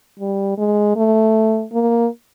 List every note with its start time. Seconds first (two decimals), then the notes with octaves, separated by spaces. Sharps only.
0.19 G3
0.58 G#3
0.96 A3
1.73 A#3